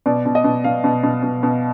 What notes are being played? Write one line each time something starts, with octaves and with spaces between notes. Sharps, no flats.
B2 D5
B2
D#5
B2
B2 F5
B2
B2
B2
B2